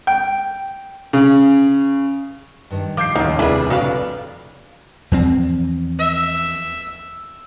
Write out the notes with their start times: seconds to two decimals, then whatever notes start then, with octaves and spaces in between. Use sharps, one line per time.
0.07 G5
1.13 C#3
2.71 G2 D#3
2.97 F3 D6 G6 C7
3.16 A1 D#2 C#3 F3 D#4 C#5
3.39 F1 C2 D4 E4 G4 G#4 B4
3.70 C#3 D4 F#4 B4 F5
5.12 E2 F3 C4
5.99 E5